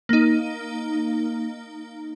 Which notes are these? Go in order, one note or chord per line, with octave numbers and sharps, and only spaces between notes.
A#3 D#4